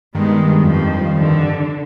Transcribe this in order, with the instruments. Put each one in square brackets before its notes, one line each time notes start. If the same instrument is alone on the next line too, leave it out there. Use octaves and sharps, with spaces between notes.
[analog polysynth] G2 D#3 [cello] G#3 B3
[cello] F2 F3
D3